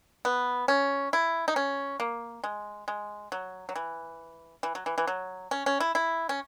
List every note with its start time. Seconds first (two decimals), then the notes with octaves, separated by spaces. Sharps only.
0.25 B3
0.68 C#4
1.13 E4
1.48 D#4
1.56 C#4
2.00 A#3
2.44 G#3
2.88 G#3
3.32 F#3
3.69 F#3
3.76 E3
4.63 E3
4.75 F#3
4.86 E3
4.98 E3
5.07 F#3
5.51 C#4
5.66 C#4
5.80 E4
5.95 E4
6.29 C#4